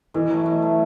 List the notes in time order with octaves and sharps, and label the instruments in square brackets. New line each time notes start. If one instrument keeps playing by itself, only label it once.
[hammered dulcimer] B2 [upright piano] E3
[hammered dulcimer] F#3 A3
B2
F#3 A3